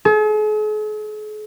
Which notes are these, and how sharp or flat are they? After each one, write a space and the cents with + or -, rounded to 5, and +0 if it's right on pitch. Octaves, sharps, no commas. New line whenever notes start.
G#4 +45